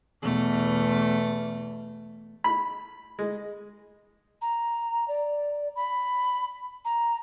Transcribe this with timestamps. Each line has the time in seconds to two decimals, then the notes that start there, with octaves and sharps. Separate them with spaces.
0.22 E2 B2 A3
2.44 B5
3.19 G#3
4.42 A#5
5.08 D5
5.76 B5
6.85 A#5